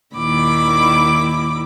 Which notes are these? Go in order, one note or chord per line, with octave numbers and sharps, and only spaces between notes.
D#2 A#2 D#3 E4 B5 D6